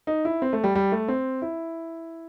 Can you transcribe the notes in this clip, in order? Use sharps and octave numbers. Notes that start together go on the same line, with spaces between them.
D#4
E4
C4
A3
G3
G3
A3
C4
E4